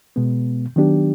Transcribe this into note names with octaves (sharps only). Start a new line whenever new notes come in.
B2 G#3 B3
D#3 F#3 B3 D4 G4